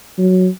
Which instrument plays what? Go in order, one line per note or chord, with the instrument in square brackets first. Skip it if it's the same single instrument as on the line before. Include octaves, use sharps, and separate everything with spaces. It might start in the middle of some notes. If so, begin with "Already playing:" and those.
[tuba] F#3